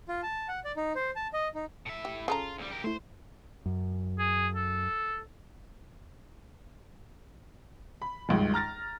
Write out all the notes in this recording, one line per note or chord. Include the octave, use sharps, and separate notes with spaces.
F4
A5
F#5
D5
D#4
C5
A5
D#5
D#4
A2 E5
G4
C#3 F4 A4 A#5
D2 G3
G4 A#4
A3 E4 C5
F#2
G#4
A4
B5
G#1 C#2 G2
A#5 F6 A6 A#6